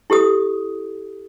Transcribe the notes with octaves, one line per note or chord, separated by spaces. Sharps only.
E4 G4 A4 D#6